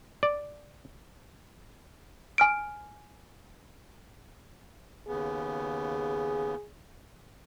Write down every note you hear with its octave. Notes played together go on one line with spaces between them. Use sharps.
D5
G#5 F6 D7
D#2 C#3 B3 G#4